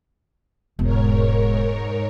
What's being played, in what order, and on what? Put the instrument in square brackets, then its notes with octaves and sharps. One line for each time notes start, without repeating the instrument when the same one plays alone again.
[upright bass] E1 [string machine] G#2 A#4 C#5